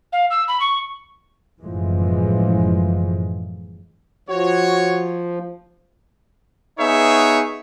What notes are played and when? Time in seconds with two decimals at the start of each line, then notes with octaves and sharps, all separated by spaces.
0.12 F5
0.30 E6
0.48 B5
0.60 C#6
1.61 F#1 A2 E3 F3 G#3
4.29 F3 F#4 C#5
6.79 B3 D#4 G#4 C#5 E5